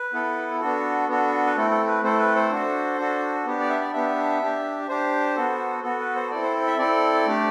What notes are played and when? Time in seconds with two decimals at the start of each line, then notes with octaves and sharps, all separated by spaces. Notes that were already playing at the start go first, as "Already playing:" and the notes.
Already playing: B4
0.13 B3 E4 A4
0.60 B3 D4 F#4 A4
1.08 B3 D4 F#4 A4
1.46 B4
1.56 A3 C4 E4 A4
1.71 A4
1.87 B4
2.03 A3 C4 E4 A4 C5
2.19 B4
2.35 C5
2.51 D4 F#4 A4
2.98 D4 F#4 A4
3.46 B3 D4 G4
3.60 D5
3.70 E5
3.81 D5
3.93 B3 D4 G4 E5
4.42 D4 G4
4.88 D4 G4 C5
5.36 B3 F#4 A4
5.83 B3 F#4 A4
6.00 B4
6.15 C5
6.31 C4 E4 A4 D5
6.43 C5
6.67 E5
6.78 C4 E4 A4 D5
7.27 A3 D4 G4